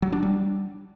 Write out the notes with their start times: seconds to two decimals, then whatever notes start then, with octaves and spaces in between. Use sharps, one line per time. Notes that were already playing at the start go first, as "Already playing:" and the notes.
0.02 F#3
0.12 D4
0.23 G3